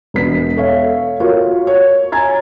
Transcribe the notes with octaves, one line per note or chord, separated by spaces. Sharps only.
E1 B3 B6
A4 C#5 E5 F5
F4 F#4 A#4 C#5
C#5
G#5 A#5 G#6 A6